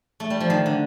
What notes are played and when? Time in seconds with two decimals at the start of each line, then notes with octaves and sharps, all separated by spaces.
0.20 A3
0.30 G3
0.40 F3
0.50 D#3
0.66 D3